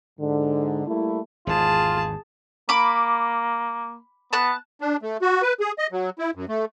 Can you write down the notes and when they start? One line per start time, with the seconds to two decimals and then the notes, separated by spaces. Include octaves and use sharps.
0.19 G#2 D3
0.86 G3 A3 A#3 E4
1.47 G#1 E2 F4 G#4 A5
2.69 A#3 B5 D6
4.33 B3 A5 F#6
4.81 D4
5.02 A3
5.22 F#4
5.42 B4
5.60 G#4
5.78 D#5
5.92 F#3
6.19 E4
6.35 F#2
6.49 A3